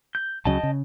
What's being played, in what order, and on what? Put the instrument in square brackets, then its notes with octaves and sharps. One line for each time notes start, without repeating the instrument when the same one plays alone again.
[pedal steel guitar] G6
[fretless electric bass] C#2 C#3 F#3 [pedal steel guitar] D#5 G5 A5
[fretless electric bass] C#3